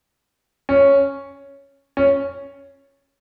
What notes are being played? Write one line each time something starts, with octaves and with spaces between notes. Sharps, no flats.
C#4
C#4